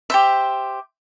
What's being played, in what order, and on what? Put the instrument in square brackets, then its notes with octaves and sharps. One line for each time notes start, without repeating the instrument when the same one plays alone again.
[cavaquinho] G4 C5 E5